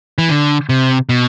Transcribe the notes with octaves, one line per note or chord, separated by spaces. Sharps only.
E3
D3
C3
B2